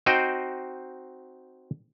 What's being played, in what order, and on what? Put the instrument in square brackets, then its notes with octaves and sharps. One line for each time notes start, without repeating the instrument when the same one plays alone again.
[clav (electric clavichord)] C4 D#4 F#4 C5 D#5 G5